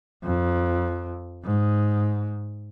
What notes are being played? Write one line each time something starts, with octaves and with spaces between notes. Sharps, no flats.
F2
G#2